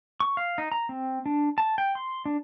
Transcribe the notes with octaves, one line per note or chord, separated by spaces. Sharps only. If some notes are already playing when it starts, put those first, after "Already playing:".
C#6
F5
D#4
A#5
C4
D4
A5
G5
C6
D4